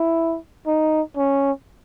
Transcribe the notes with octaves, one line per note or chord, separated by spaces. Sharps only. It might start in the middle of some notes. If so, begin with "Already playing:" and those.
Already playing: E4
D#4
C#4